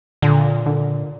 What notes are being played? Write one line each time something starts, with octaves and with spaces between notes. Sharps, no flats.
A#2 D3
D3